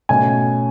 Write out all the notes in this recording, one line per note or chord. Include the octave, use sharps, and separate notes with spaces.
B2 A3 C#4 G#5